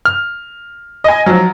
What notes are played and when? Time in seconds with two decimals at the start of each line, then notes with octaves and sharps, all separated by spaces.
0.05 F6
1.04 D#5 G#5
1.26 F3 F#3